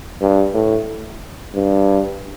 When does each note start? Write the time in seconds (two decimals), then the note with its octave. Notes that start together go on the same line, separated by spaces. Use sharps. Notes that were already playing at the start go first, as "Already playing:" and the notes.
0.21 G2
0.54 A2
1.54 G2